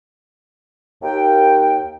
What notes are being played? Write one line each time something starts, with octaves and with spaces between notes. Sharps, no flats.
D#2 G5